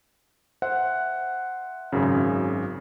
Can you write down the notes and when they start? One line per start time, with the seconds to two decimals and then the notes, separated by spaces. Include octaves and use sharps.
0.62 C5 E5 F#5
1.92 G#1 F#2 C#3